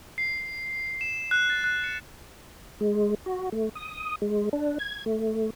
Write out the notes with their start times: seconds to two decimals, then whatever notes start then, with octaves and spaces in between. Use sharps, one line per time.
0.18 C7
1.01 E7
1.31 F#6
1.50 A6
1.64 F#6
1.84 C#7
2.81 G#3
3.26 F#4
3.52 A3
3.75 D#6
4.22 G#3
4.53 D4
4.79 G#6
5.06 A3